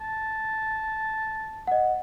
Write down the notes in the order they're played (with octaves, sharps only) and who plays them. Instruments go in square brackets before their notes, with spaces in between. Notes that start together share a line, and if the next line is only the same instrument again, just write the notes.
[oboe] A5
[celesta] D#5 F#5